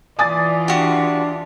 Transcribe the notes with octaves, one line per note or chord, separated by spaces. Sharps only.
E3 F4 D5 G#5 D#6 A6
D4 F#4 G4